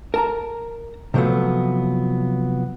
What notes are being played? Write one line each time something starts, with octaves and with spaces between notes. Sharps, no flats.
A#4 A5 A#5
C3 F3 F#3 A3 B3